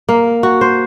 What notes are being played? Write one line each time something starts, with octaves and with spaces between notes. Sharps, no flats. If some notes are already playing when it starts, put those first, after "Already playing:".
A#3
F#4
C5